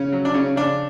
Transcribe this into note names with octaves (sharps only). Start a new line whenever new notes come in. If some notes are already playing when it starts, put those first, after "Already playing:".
Already playing: C#3 C#4
F#3
D4
C#3 C#4
C#3 D4